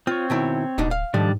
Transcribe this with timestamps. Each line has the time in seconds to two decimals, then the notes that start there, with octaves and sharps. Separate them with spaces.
0.07 C4 F4 C#5
0.30 B2 D#3 E4
0.78 D1 B2 D4 D#4
0.91 F5
1.14 G#2 D#3 F3 G3 A3 D4